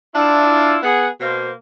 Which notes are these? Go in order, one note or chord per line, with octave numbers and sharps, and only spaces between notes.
D4 E4 F4
B3 G#4 F#5
B2 A#3 C5